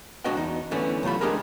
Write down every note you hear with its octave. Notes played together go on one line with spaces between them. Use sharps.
G#3 D4 F#4 D#5 F#5 G5
E2 D#4
D3 E3 A3 B3 C#4
C2 F#3 A3 F4 B5
G#3 A3 D4 G4 G#4 A#4